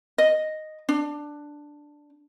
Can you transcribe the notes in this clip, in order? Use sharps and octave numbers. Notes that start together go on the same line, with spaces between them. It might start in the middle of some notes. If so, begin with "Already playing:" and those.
D#5
D4